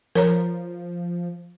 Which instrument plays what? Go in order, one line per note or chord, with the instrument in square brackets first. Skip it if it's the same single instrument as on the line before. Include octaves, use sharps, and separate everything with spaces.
[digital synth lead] F3 [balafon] A#4 C#5 A#5